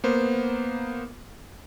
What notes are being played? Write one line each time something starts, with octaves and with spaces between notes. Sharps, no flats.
A#3 B3 C5